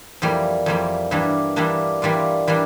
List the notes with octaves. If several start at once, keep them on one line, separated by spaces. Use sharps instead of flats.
F2 E3 G3 A#3
F2 E3 G3 A#3
G2 E3 G3 A#3 D4
G2 E3 G3 A#3 D4
E3 G3 A#3 D4 F4
E3 G3 A#3 D4